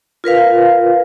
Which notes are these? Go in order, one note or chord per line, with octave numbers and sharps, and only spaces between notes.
F4 A#4 B4 F5